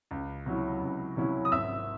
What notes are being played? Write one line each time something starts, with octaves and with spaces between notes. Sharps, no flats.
C#2
C3 F#3 C#4 E4
C#2
C3 F#3 C#4 E4
D#6
G#1 E5 E6